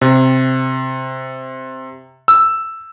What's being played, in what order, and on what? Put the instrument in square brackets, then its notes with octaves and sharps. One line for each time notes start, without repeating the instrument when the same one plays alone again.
[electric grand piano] C3
E6